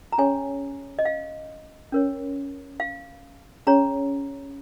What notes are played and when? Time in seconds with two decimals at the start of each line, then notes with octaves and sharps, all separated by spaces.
0.12 A#5
0.18 C#4 G#4 C#5 G#5
0.99 D#5
1.05 F5
1.92 C#4 A#4 C#5
2.80 F5
3.67 C#4 G#4 C#5 A#5